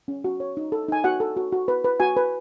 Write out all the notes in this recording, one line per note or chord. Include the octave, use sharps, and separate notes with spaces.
C#4
F#4
C#5
D#4
A4
D#4 G#5
F#4 F#5
A4
F#4
F#4
B4
B4
F#4 G#5
B4